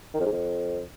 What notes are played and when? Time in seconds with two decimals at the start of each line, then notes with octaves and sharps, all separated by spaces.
0.14 D#3
0.20 F2
0.26 G#2
0.32 F2